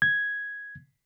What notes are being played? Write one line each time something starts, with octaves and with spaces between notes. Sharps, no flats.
G#6